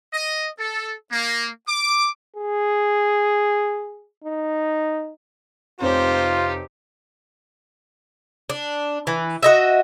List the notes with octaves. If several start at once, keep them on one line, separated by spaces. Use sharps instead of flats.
D#5
A4
A#3
D6
G#4
D#4
F1 C3 D#4 F4 G4 C5 C#5
D4
E3
F#4 D#5 E5